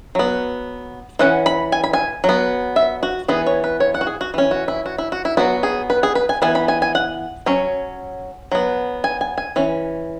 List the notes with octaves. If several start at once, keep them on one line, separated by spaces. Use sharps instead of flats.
F#3 B3
E3 C#4 F#5
B5
G#5
B5
G#5
F#3
B3
E5
F#4
E3 B3 G#4
C#5
B4
C#5
F#5
F#4
G#4
F#4
E3 C#4
F#4
E4
F#4
E4
F#4
E4
F#3 B3 F#4
G#4
B4
G#4
B4
G#5
E3 B3 G#5
B5
G#5
G#5
F#5
F#3 C#4
F#3 B3
G#5
G#5
G#5
E3 C#4